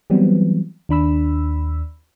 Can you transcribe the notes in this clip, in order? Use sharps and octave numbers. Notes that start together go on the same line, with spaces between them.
E3 F#3 G3 B3 C4
D#2 D4 B5 E6